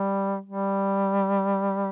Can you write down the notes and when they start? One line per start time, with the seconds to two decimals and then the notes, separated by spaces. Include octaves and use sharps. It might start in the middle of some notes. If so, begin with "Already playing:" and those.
Already playing: G3
0.46 G3